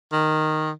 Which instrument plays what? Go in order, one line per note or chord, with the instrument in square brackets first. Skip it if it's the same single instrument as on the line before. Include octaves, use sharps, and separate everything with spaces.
[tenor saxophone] D#3